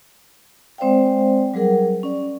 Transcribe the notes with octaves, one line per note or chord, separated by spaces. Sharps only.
G#3 C4 C5 D5 F5 G5
F#3 G3 G#4 A#4 F#5
C#4 D5